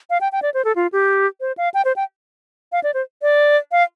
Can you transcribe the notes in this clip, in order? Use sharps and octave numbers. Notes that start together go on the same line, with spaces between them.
F5
G5
G5
D5
C5
A4
F4
G4
C5
F5
G5
C5
G5
F5
D5
C5
D5
F5